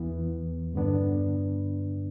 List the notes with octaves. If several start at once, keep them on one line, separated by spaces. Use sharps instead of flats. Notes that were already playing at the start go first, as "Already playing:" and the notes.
Already playing: E2 E3 B3
G2 D3 B3 D4